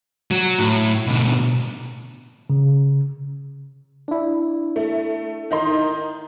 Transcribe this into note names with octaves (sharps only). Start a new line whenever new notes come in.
F#3
A2
B2 D3
C#3
D4 E4
A3
D#3 D#4 C6